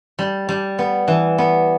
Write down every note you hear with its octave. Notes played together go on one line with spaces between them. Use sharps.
G3
G3
B3
E3
B3